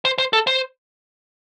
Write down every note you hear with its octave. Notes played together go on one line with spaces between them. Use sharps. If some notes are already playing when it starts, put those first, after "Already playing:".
C5
C5
A4
C5